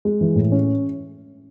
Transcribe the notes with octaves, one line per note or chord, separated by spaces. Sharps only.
G#3
E3
A2
C#4